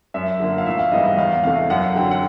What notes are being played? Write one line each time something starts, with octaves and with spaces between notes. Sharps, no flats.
F#2 E5
D3 F3 A#3
F5
A1 E5
F5
G#2 E3 G3 B3 D#5
D#5
E2 F5
C3 E3 A3 F5
F#2 F#5
D3 F#3 G5
F#5